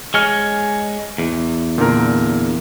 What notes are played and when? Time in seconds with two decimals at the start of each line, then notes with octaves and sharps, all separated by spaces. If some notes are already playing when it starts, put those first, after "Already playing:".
0.14 G#3 C#5 G#5 F6
1.18 E2
1.78 A#2 D3 A#4